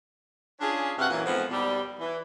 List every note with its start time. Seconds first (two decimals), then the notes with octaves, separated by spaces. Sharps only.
0.61 C#4 D4 F4 G#4
0.98 G2 C3 F#4 F5 F#5
1.10 F#2 A#2 E3
1.26 F2 G#2 F3 B3
1.50 D#2 B2 G3
2.00 E3